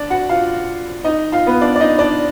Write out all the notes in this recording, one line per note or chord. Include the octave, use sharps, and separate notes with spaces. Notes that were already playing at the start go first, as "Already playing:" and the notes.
Already playing: D4 D5
F#4 F#5
F4 F5
D#4 D#5
F4 F5
B3 B4
D4 D5
D5
D#4 D#5
D4 D5